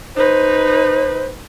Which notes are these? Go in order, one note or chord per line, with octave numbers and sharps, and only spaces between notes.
D#4 B4 C5